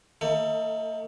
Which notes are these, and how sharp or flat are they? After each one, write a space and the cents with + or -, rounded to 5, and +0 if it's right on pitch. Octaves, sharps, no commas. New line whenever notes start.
A#3 -45 D#4 +35 A4 +30